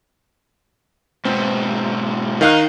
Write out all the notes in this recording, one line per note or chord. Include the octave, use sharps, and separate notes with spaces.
G#2 B2 C4
D#3 D#4 F5 F#6